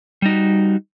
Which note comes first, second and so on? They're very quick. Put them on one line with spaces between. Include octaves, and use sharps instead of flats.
G3 D#4 F#4